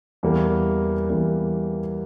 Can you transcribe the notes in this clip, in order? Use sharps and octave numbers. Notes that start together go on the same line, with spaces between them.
E2 E3 G3 A#3
E2 E3 G3 A#3